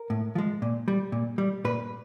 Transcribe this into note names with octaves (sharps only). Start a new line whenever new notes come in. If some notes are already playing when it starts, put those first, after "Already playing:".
Already playing: A#4
A2
F3 G#3
A#2
G3
A#2
G3
A#2 B4